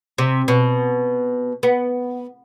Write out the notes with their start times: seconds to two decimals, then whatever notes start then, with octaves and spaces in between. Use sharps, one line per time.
0.18 C3
0.48 B2
1.63 B3